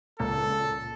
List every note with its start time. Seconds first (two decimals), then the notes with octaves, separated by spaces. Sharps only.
0.20 C#2 A#2 A#3 A4